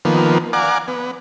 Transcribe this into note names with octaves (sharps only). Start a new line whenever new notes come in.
D#3 F3 A#3 B3
D5 F5 F#5 G#5 A#5 D6
B3